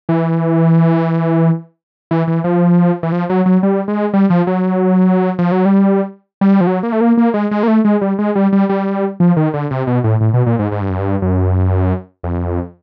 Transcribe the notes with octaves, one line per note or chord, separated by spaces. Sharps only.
E3
E3
E3
F3
E3
F3
F#3
F#3
G3
G#3
G3
F3
F#3
F3
F#3
G3
G3
F3
F#3
A#3
A3
A#3
A#3
G#3
G#3
A#3
A3
G#3
G3
G#3
G3
G3
G3
F3
D#3
D3
C3
B2
A2
A2
B2
A#2
G#2
G#2
G2
F#2
G2
F#2
F2